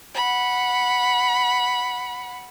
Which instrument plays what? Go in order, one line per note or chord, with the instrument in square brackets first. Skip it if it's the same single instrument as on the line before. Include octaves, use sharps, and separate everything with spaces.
[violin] F#5 B5